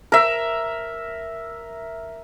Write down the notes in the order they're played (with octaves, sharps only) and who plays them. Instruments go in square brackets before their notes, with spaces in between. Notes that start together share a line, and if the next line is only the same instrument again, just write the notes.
[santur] A#4 E5